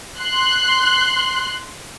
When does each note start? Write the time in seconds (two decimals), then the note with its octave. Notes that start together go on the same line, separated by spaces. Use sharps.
0.19 C6 F#6